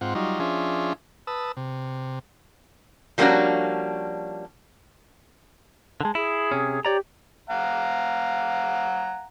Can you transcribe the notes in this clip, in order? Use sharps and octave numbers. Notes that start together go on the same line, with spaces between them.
G#2 C4 F4 F#5
F#3 G3 D#4 F4
F3 C#4 D4 F4 G#4 E5
B4 A5 D#6 E6
C3
F3 G3 A#3 C#4 D4 F#4
D3 G#3 A5
E4 G#4
C3 C#4
G4 C#5 D5 A#5
F5 F#5 A#5